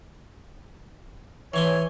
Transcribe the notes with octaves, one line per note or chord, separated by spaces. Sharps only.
E3 C#5 G#5 C6